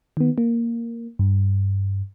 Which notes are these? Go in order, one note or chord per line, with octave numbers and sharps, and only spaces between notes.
D#3 B3
A#3
G2